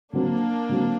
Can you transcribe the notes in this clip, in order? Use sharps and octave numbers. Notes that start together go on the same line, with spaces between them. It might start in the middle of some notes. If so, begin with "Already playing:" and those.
D3 F#3 A#3 C4 D4
D3 F#3 C4